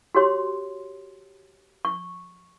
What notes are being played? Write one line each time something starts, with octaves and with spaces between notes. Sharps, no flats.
F#4 G4 C#5 C6
C#6